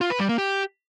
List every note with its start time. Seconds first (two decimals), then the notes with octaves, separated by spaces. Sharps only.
0.01 F4
0.10 B4
0.20 G3
0.29 A#3
0.38 G4